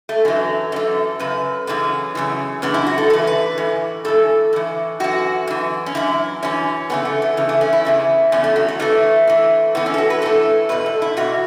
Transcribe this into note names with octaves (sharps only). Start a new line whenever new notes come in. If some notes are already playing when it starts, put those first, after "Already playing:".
A3
F#2 E3 F#3
F#2 E3 A4
F#2 C#3 B4
F#2 C#3 E3 B3
F#2 C#3 E3
F#2 C#3 E3 B3
E4
F#4
A4
A2 E3 B4
B4
A2 E3
A2 E3 A4
A2 E3
F#2 E3 F#4
F#2 E3
C#4
F#2 E3 E4
F#2 E3 C#4
E2 C#3 E3 B3
A3
A3
E2 C#3 E3
A3
C#4
E4
E2 C#3 E3
E2 C#3 C#4
A3
F#3
A3
A2 E3 A3
A2 E3
A2 E3 B3
C#4
A4
F#4
B4
A2 E3 A4
E2 B2 B4
A4
E4
E2 B2 F#4